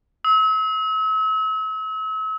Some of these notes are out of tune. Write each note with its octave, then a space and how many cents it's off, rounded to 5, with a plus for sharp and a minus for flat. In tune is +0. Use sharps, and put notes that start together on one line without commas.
E6 -40